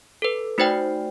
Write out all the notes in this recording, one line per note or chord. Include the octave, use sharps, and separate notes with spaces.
A4 B4
A3 D#4 F#4 C5 D5 G5